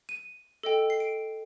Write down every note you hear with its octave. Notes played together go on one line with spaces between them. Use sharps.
D#7
A4 D#5 G5
C7
D7